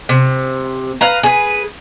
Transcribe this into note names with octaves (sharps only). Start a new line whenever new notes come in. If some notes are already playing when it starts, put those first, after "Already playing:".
C3
B4 F5 A#5
G#4 B4